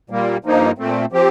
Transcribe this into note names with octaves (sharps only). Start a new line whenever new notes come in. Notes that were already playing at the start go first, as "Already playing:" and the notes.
A#2 G3 A#3
G2 F3 A#3 D#4
A#2 A3 C4
F3 C4 G4